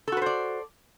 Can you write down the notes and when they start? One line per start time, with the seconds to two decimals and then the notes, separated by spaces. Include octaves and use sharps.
0.08 A4
0.12 F#4
0.17 B4
0.22 C5
0.26 D5